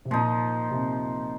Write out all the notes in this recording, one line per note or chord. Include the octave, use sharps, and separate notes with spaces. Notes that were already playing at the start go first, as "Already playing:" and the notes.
C3
A#2 F3 D#4
C3